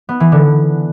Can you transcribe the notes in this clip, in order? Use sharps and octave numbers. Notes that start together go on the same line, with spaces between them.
B3
E3
D3